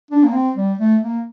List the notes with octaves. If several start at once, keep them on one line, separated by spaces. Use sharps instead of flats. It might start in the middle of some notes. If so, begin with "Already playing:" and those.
D4
A#3
C4
G3
A3
A#3